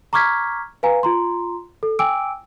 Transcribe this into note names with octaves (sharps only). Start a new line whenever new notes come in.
A#5 C#6 D6 F6 G#6 B6
B4 F5 G#5 A#5
F4 A#5 C6
A4
G5 G#5 D6 E6 D7